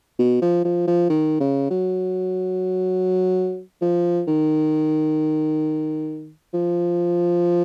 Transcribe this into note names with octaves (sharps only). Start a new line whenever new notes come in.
B2
F3
F3
F3
D#3
C#3
F#3
F3
D#3
F3